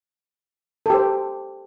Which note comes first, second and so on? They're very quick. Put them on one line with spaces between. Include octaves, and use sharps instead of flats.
A4 G4 C5